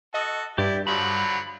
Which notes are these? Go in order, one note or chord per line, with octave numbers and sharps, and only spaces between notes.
F#4 A4 D#5
G2 E4 G4 D5
D3 F3 F#3 B5